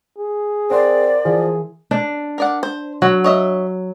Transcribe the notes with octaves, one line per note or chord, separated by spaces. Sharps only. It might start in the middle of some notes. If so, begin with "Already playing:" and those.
G#4
C4 A#4 D5 F#5 C6
E3 F3 G#4
D4
A#4 D5 F#5
C5
F#3 F#4
C#5 D#5 E5